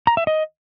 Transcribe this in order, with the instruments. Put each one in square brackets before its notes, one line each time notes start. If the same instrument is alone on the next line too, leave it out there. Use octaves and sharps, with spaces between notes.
[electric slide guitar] A#5
E5
D#5